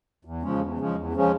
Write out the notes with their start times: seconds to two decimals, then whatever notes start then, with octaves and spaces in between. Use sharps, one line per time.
0.25 E2
0.43 C#3 F3 G#3 C#4
0.61 E2
0.78 C#3 F3 G#3 C#4
0.96 E2
1.13 C#3 F3 G#3 C#4